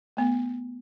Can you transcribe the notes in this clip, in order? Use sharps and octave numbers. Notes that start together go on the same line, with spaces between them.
A3 B3